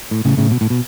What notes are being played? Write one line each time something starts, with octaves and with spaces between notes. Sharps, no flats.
A2
A2 C#3
A2 C#3
B2
A2
B2